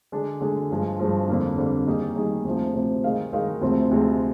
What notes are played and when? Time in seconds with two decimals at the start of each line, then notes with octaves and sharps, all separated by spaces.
0.12 D3 G#3 D4 G#4
0.41 D3 G#3 D4 G#4
0.71 G2 F3 G#3
0.99 G2 F3 G#3
1.28 F2 D3 G3 A#3 D4
1.57 F2 D3 G3 A#3 D4
1.87 D#3 G3 A#3 D#4 G#4
2.16 D#3 G3 A#3 D#4 G#4
2.45 D2 C3 F3
2.74 D2 C3 F3
3.04 D#3 G#3 D#4 A#4 F5
3.33 D#3 G#3 D#4 A#4 F5
3.61 D2 C3 F3 G#3 C4
3.91 D2 C3 F3 G#3 C4